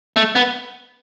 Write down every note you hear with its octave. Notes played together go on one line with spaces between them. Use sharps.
A3
B3